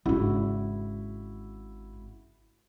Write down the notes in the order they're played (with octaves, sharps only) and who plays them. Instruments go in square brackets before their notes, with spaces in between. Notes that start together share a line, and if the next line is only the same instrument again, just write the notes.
[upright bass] G#1 D4 [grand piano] C#3 E4 F#4